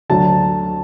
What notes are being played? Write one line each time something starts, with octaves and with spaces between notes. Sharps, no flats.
D2 D3 F#3 A5